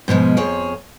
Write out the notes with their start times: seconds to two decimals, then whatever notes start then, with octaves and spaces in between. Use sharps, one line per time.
0.08 G#2 B2 F3 G#3
0.37 F2 F3 G#4 C#5